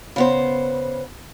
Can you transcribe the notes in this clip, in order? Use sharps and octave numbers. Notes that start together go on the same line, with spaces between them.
C#3 B3 C5